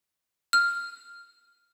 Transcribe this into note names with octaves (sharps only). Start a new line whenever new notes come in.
F6